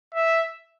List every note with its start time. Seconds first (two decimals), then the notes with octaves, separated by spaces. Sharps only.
0.14 E5